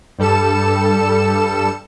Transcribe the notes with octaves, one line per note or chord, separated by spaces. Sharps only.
G2 G3 A4 C#7 E7